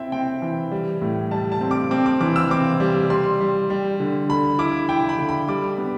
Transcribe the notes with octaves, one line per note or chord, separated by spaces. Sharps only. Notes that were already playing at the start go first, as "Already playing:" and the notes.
Already playing: C4 E4 E5 G5
C4 G5
E3
G3
A2
G3 A5
A5
C4
D6
C4 D6
D6
E3 D6
E6
C4 D6
G3
G3 C6
G3
G3
D3
D3 B5
E4 D6
E4 G5
B5
D3
B5
G3 D6
B3